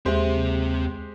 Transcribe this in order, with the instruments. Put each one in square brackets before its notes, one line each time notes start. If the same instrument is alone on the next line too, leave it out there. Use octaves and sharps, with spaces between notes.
[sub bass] D#2 [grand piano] G#3 G4 C5 [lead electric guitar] C4 E5